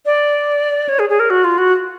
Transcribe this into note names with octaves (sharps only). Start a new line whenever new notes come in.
D5
C#5
G#4
G#4
A#4
F#4
F4
F#4